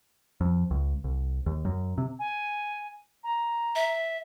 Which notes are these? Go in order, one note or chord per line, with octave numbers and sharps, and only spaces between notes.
F2
C#2
C2
D#2
F#2
C3
G#5
A#5
E5